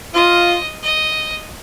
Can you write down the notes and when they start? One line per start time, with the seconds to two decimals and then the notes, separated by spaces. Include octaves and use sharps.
0.14 F4 D#5
0.83 D#5